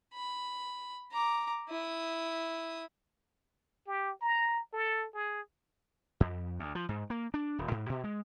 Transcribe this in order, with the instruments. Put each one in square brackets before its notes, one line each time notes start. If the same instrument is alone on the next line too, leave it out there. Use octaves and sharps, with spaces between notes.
[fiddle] B5
A#5 D6
E4 D#6
[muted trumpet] G4
A#5
A4
G#4
[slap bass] F2
D2
F3
G#2
A#3
D4
D#1
G#2
B2
G#3